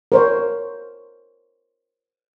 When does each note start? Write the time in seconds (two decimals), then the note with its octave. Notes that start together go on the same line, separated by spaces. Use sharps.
0.12 A#4 C5 C#5